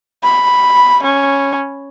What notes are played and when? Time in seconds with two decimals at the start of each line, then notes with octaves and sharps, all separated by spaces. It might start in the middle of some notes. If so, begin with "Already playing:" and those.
0.24 B5
1.03 C#4